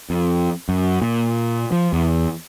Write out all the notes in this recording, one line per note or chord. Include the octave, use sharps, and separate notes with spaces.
F2
F#2
A#2
F3
E2